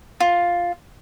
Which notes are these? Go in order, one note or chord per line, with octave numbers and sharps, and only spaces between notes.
F4